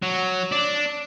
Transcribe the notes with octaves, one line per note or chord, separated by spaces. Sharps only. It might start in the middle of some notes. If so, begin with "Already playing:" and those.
F#3
D4